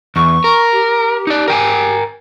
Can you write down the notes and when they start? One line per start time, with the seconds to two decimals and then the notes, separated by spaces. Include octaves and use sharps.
0.16 E2 C#6
0.44 A#4
0.72 G4
1.27 D#4 D5
1.48 A#4 G5 G#5